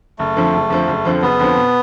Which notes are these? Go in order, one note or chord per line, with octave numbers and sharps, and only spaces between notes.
F#1 A3
F2 D3 F3
F#1
F2 D3 F3
F#1
F2 D3 F3
F#1 B3
F2 D3 F3
B2